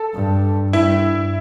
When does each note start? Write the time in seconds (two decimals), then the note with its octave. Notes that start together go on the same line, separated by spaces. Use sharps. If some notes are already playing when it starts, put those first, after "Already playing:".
Already playing: A4
0.14 G2
0.73 G2 E4